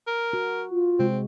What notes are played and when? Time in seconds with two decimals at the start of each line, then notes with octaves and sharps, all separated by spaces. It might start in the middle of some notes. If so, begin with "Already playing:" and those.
0.07 A#4
0.33 F#4
0.71 F4
0.99 C3 G#3 C4